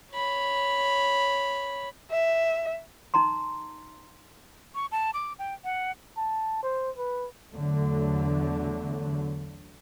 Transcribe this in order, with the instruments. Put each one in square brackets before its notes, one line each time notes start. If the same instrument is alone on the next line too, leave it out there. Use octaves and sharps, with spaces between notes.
[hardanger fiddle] C#5 B5
[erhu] E5
[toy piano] D#4 A#5 C6
[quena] C#6
A5
D6
G5
F#5
[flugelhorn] A5
C5
B4
[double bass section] E2 D3 F#3 A3